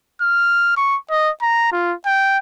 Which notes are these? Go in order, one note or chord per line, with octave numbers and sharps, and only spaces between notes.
F6
C#6
D#5
A#5
F4
G5